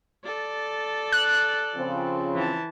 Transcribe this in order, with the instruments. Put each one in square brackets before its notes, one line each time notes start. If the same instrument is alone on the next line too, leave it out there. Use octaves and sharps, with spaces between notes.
[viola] A4 D5
[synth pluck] F#6
[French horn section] C#3 F3 C4
[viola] E3 A5